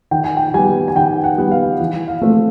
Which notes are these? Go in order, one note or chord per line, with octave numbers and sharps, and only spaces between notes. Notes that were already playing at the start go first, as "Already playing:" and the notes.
D#3 G5
G#5
G5
G3 B3 G#5
G#5
D#3 G5
F#5
G3 B3
F5
E3
F5
A3 C4